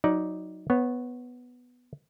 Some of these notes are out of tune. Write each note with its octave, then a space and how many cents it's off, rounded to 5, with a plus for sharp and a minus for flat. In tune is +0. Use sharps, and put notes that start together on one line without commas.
F#3 -10 D#4 +10 D5 +0
B3 +0 C#5 -15